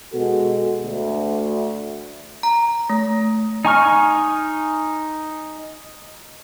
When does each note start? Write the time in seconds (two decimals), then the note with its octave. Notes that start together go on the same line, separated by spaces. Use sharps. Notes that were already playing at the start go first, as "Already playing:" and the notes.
0.14 B2 G#3 F#4 A4
0.83 D2
2.43 A#5
2.90 A3
3.65 D#4 G#5 C#6 F6